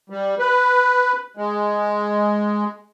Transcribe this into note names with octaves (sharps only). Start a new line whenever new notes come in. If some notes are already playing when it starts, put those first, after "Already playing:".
G3
B4
G#3